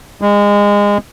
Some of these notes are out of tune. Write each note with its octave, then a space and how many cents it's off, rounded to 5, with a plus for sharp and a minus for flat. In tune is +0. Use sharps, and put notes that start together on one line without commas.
G#3 -25